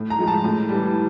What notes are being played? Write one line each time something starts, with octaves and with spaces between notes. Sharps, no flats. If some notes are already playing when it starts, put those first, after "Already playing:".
Already playing: A2
A#5
F3 G#3
A5
A2
E3 G3